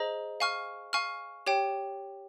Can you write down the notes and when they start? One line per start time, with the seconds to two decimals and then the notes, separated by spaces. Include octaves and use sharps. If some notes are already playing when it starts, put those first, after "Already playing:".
Already playing: G#4 C5 D#5 A#5
0.40 F5 G#5 C#6 F6
0.93 F5 G#5 C#6 F6
1.46 G4 C#5 G5